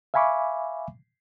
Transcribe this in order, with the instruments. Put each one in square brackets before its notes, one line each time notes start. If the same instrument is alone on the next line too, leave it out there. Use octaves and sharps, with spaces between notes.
[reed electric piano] E5 F5 G#5 B5 C#6 D6